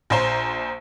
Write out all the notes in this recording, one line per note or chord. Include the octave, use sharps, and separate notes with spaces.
A#1 C5 A#5